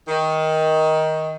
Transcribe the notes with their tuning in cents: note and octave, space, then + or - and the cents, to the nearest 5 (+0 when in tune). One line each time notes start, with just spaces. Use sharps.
D#3 +15